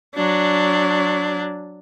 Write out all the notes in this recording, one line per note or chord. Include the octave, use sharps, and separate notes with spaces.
F#3 D4